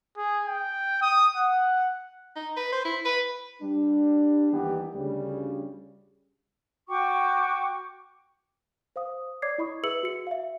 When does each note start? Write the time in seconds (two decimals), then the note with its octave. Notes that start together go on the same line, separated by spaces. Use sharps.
0.17 G#4
0.47 G5
1.02 D#6
1.36 F#5
2.36 D#4
2.56 B4
2.72 C5
2.85 E4
3.05 B4
3.62 G3 D4
4.52 D#2 D#3 E3 G3 B3 G4
4.94 D2 C#3 G3
6.89 F#4 G5 C#6 D6
8.96 C5 F5 D#6
9.42 C#5 D5 D6 G#6 C7
9.58 E4 D#5 B5 C#6 D#6
9.83 G#4 B4 E5 E6 C#7 F#7
10.03 F#4 C#7
10.27 E5 F5